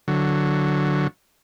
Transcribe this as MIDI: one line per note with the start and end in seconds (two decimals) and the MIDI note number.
0.08 1.07 50
0.08 1.07 54